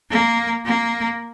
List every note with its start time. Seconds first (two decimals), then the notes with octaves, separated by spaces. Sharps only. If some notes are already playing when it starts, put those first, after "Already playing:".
0.10 A#3
0.65 A#3